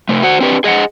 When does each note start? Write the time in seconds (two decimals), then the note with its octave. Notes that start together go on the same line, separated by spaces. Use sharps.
0.09 C3 A3
0.23 F#4 C5 F#5
0.41 C4 D4 G4 B4
0.64 G#4 D#5 F5 F#5